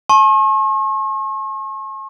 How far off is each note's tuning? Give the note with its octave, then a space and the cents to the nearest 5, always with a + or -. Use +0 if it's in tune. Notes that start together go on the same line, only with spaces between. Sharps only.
A5 -35 C#6 -45